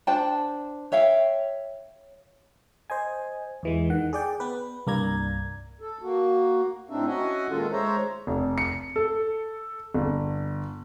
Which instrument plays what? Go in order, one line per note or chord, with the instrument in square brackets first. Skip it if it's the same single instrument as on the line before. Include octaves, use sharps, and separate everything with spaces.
[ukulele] D4 C5 G5 A5
C#5 E5 F5 G5
[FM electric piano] C5 D#5 G#5
E2 E3 G#3
D#3 F#5
G#4 D5 G5
B3 B4
C2 G2 A#3 D5 A#5 G#6
[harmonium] A4
A#3 F#4
A2 C4 D4 D#4 E5
C#4 F#4 D#5 E5 F#5 G#5
A#2 D#3 G#3 F4 A4
G#3 C5 C#5 E5 A#5
[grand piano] F1
C#7
A4
G1